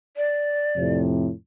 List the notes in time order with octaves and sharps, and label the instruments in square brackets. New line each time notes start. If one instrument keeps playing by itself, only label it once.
[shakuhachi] D5
[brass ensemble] F2 A2 C3